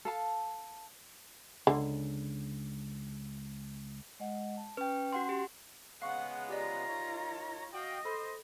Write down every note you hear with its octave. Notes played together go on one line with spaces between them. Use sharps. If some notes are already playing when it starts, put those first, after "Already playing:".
A4 F5 A5
C#2 D3
G#3 D#5 F#5
A5
C#4 B4 G5
F#4 F#5 C6
G4
C#3 G#3 B3 F5 F#5 C#6
F4 G4 D5 D#5 A#5
D#4 A#4 C#5
F#4 D#5 F5 G5
A4 C5 B5